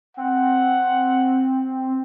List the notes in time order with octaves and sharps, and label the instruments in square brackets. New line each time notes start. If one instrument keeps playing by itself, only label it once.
[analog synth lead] C4 [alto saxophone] F#5